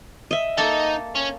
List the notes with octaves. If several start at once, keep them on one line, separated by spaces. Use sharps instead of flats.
D#5 E5
A#3 D#4 A4
C#4